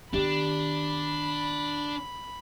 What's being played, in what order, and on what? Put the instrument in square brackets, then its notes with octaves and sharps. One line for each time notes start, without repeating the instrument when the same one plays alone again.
[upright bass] D#3 B3 [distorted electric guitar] D4 [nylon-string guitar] G4 [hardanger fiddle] B5